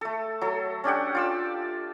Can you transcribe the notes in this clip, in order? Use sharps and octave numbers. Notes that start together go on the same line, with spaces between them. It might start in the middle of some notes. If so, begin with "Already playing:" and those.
A3 A4
F#3 A4
C#4 D4 G4 F#5
F4 D5 E6